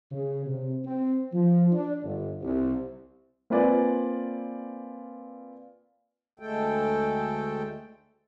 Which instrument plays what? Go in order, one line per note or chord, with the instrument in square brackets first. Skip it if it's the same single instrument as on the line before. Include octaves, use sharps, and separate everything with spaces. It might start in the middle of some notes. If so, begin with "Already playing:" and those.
[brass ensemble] C#3
C3
C4
F3
D4
G1
C2
[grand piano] A#3 C4 F4 B4 D5 G#5
[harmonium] D2 G#3 A3 A4 G5